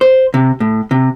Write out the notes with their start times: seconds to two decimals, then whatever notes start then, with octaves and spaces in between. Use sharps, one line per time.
0.01 C5
0.34 C3
0.60 A2
0.91 C3